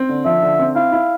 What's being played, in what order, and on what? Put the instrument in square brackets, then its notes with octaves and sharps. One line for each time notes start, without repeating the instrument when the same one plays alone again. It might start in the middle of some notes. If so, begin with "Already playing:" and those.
Already playing: [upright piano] C4
D3
[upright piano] F3 [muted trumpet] E5
[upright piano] D3
C4
[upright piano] E4 [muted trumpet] F5
[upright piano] E4